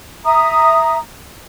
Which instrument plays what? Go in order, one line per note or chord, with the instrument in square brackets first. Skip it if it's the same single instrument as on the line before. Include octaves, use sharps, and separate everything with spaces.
[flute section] E5 A#5 D#6